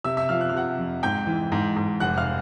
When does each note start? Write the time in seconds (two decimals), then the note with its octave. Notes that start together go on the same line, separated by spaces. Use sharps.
0.04 C3 E5 E6
0.17 E5 E6
0.29 F3 F5 F6
0.41 F#6
0.50 F6
0.53 C3 F#5 F#6
0.78 F2
1.03 G#2 G5 G6
1.27 E3
1.52 G#2
1.76 G#2
2.00 F1 F#5 F#6
2.18 F5 F6